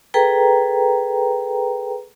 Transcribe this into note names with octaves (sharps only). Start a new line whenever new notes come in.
G#4 A4 B4 G5 A#5